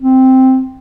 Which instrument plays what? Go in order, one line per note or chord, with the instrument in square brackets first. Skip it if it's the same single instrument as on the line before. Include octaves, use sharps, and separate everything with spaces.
[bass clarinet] C4